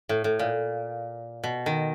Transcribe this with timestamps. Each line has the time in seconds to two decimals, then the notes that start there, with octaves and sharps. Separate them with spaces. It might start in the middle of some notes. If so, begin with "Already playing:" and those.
0.09 A2
0.24 A2
0.39 A#2
1.44 B2
1.66 D#3